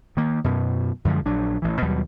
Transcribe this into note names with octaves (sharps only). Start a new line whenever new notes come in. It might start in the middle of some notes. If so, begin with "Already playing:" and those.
D#3 A#3
F#2 B2
F#2 D3 F3 G#3
A#1 F#3 D4
A1 E3
D#2 B2 F#3 G3